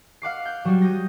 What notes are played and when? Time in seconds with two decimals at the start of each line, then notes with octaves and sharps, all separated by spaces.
0.22 F5 F#5 D6 C7
0.45 G6
0.65 F#3 G3 F#4
0.82 D#6 G6 A#6